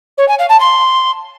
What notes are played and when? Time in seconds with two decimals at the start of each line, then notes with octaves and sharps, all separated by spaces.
0.17 C#5
0.28 G#5
0.39 F5
0.49 A5
0.60 C6